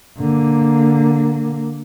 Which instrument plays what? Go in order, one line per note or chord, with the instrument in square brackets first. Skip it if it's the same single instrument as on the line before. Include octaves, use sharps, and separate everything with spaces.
[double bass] D3 A#3